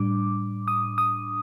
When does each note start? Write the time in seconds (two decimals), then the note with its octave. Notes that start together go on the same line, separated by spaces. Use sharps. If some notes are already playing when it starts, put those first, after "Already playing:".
Already playing: A2 G3 D4 D6
0.68 D#6
0.98 D#6